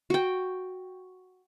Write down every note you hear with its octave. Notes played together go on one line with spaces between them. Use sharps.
F#4 G5